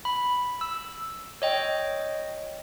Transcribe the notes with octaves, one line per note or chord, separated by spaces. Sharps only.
B5
E6
C#5 D#5 G5